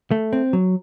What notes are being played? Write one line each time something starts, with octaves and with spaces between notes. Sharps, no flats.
A3
C4
F#3